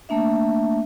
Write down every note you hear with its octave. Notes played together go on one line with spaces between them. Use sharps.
A3 A#3 D4 E5